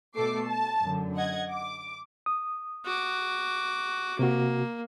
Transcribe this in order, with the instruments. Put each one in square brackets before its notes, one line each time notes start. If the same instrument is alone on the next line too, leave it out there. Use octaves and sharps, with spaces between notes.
[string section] B2 A3 A4 D6 C7
A5
F#2 D3
D#5 F#5 G#6
D6
[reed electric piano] D#6
[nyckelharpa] F#4 D6
[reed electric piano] C3 F#4 [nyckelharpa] A#3